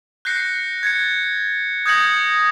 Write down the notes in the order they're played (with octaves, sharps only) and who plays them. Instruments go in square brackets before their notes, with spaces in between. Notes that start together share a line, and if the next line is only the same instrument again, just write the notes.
[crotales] F#6 G6 A#6 C7 C#7
G#6 A6 C#7
D#6 G6 G#6 A#6 C#7 F#7